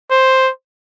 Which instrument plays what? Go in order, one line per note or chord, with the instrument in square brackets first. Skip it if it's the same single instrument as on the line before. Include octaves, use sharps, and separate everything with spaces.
[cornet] C5